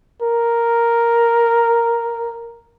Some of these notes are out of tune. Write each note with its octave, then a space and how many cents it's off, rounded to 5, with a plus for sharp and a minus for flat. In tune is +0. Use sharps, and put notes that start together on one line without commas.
A#4 +0